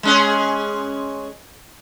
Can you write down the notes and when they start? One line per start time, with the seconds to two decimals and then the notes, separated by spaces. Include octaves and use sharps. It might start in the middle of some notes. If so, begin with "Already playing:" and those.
0.03 G#3 C#4 G#4